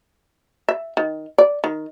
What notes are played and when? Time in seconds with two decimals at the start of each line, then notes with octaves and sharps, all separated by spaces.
0.69 E5
0.97 D#3
1.38 D5
1.64 D#3